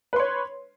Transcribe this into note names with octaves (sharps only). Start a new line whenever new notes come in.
B4 C#5 C6